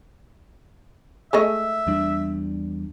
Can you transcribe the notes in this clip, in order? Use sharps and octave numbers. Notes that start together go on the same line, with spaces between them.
G#3 A3 D#5 E5
E2 G3 D4